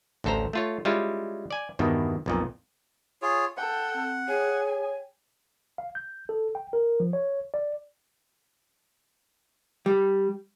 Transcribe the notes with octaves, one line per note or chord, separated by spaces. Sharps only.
A1 D2 A4 C5 A#5
A3 F4 C#5
G3 G#3 C#4 E4 F4
D5 G#5
E2 G2 B2 D#3
B1 F2 A#2
F4 G#4 C#5
A4 F#5 G5
C4
G#4 C#5 G5 G#5
F5
G6
A4
G5
A#4
F3
C#5
D5
G3